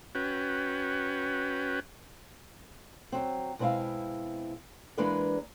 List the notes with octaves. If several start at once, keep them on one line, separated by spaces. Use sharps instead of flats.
C#4 F#4 B4 G5
F#3 C4
B2 G#3 C4 E4 E5 F5
E3 G#3 A#3 D4 B4 D5